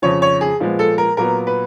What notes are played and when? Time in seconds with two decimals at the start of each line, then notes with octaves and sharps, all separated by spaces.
0.02 F2 C#3 F3 C#5
0.22 C#5
0.41 G#4
0.60 A#2 F3 G#3 B3
0.79 A4
0.98 A#4
1.17 A#2 F#3 B3 A#4
1.47 B4